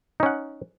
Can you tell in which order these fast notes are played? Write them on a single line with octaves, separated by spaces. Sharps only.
D#4 C#4 F#5